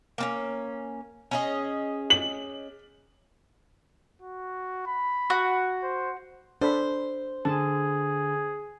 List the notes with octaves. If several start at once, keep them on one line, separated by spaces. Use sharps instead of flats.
A#3 C4 C#4
C#4 G#4 D#5
F#7
F#4
B5
F#4
C5
D4 A4 C5 B5
D3 G#4 A5